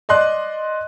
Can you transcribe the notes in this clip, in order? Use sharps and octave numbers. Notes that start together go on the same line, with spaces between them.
D5 D#5 C6 F#6